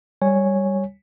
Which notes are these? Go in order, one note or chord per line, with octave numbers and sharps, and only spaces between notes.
G3 C#5 G#5